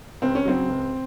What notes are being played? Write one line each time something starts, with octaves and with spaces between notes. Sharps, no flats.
C#2 C4
C#4
C#3 F#3 C4
C#2